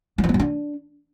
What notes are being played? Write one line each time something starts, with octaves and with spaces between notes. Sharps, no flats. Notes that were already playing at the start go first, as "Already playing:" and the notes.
F#3
F3
B3
F#3
D4